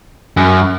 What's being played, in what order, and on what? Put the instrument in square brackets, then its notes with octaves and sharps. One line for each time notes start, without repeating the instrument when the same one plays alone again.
[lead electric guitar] F#2